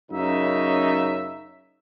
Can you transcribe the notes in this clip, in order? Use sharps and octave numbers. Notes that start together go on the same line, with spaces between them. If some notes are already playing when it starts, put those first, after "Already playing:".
F#2 C#3 A#3 D#4 E5